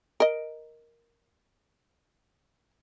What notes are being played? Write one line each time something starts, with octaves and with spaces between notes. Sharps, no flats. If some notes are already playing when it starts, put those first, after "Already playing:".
A#4 D#5